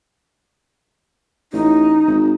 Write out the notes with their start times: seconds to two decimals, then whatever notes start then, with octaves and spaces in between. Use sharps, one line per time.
1.53 A1 D#4
2.07 G#1